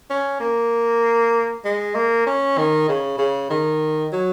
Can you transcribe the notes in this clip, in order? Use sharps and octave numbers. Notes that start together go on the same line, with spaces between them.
C#4
A#3
G#3
A#3
C#4
D#3
C#3
C#3
D#3
F#3